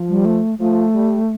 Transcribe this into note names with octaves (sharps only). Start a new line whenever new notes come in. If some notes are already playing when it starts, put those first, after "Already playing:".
Already playing: F3
G3
A3
F3 A3
G3